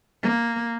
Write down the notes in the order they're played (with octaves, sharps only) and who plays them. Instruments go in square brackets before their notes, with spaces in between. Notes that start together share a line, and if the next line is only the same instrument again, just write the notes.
[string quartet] A#3